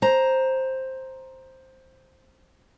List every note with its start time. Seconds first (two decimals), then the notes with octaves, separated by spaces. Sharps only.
0.02 C5 A#5